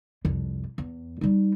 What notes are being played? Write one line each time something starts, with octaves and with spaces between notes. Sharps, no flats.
C2 F2
E2
G3 D#4